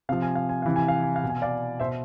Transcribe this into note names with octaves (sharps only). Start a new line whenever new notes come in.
C3 F3 F5
G#5
F5
G#5
C3 E3 F5
G#5
F5
G#5
F5
B2
G#5
D5 F5
B2 C5 E5